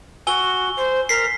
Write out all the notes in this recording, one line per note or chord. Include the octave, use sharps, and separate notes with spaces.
F#4 G#5 E6 G7
C5
A#4 B6 C7